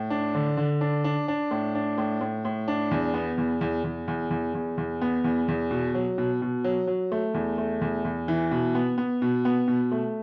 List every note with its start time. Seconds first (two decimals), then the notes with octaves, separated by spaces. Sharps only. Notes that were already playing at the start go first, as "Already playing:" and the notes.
Already playing: A2
0.10 D4
0.35 D3
0.57 D3
0.81 D4
1.04 D4
1.28 D4
1.51 A2
1.75 D4
1.98 A2
2.21 A2
2.45 A2
2.68 D4
2.91 E2
3.14 B3
3.38 E2
3.61 E2
3.84 E2
4.08 E2
4.30 E2
4.54 E2
4.78 E2
5.02 B3
5.24 E2
5.48 E2
5.71 B2
5.94 F#3
6.18 B2
6.42 B2
6.64 F#3
6.87 F#3
7.12 A3
7.34 E2
7.58 A3
7.81 E2
8.05 E2
8.28 E3
8.51 B2
8.75 B3
8.98 B3
9.22 B2
9.45 B3
9.68 B2
9.92 A3